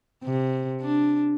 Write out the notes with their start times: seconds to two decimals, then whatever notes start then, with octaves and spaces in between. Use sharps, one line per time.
0.24 C3
0.81 D4